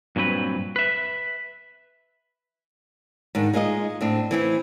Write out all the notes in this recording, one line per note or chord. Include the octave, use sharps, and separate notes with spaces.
G2 A#2 F#3 C4 B4
B4 E5
G#2 D#3 D4
G#3 D#4 F4 D5 D#5
A2 C4 D4
E3 C4 E4